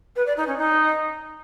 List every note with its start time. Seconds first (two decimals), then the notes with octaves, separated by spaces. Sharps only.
0.16 B4
0.26 D5
0.37 D#4
0.47 C#4
0.58 D#4